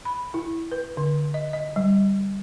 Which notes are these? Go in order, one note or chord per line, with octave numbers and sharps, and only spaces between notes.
B5
E4
B4
D3
D#5
D#5
G3